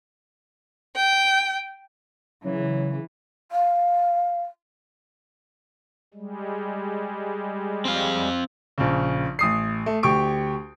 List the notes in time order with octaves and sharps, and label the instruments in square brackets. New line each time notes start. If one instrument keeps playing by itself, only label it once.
[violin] G5
[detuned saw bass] C#3 [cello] E3 [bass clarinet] F#3
[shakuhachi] F5
[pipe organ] G3 G#3
[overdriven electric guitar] C4 F5
[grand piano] A#1 C#3
A1 D#6 C7
A3
D2 G4 C#6 D7